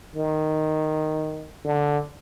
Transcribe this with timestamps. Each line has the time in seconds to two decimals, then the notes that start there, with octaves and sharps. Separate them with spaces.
0.16 D#3
1.64 D3